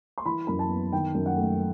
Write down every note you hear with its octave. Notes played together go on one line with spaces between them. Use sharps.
C6
E3 B5
F#2 B5
A5
B3
D#3 G5
F#2
F#5
A3